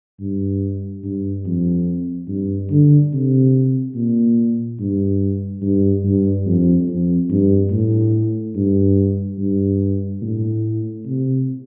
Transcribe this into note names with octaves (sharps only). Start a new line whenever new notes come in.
G2
G2
F2
G2
D3
C3
A#2
G2
G2
G2
F2
F2
G2
A2
G2
G2
A2
C3